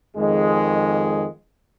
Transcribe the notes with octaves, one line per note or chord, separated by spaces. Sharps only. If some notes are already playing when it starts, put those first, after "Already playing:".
F2 D#3 G#3